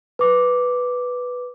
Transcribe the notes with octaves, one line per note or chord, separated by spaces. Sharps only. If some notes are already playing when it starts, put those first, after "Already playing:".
B4 D6